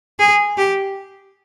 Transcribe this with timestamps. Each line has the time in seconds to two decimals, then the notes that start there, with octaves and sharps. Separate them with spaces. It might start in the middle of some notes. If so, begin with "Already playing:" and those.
0.19 G#4
0.57 G4